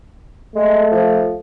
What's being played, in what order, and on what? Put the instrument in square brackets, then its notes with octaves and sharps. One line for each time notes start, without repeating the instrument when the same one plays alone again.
[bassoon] G#3 [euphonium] A3
[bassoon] F3